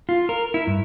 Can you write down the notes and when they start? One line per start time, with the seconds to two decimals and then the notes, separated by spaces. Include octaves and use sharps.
0.09 F4
0.29 A#4
0.54 E4
0.67 G2